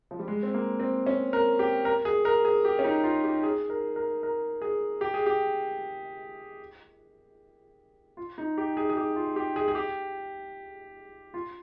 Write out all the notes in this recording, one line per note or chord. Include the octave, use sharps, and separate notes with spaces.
F3
G3
G#3
C4
A#3
C4
C#4
A#4
G4
A#4
G#4
A#4
G#4
G4
C#4
D#4
F4
G4
G#4
A#4
A#4
A#4
G#4
G4
G#4
G4
F4
D#4
G4
G#4
G#4
G4
F4
G4
G#4
G#4
G4
F4